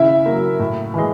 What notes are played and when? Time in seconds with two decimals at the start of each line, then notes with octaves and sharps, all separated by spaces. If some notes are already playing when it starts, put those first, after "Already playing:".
Already playing: C#3 E4 E5
0.26 F#3 A#3
0.59 A2
0.94 E3 G#3